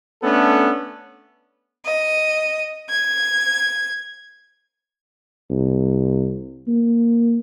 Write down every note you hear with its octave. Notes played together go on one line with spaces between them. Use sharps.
A3 B3 C#4 D4 A4
D#5
G#6
C2
A#3